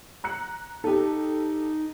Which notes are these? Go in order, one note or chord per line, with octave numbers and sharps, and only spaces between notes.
A#5 F#6 C#7
D#4 G4 A4